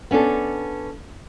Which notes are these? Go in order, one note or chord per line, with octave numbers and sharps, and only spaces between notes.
B3 C#4 D4 A4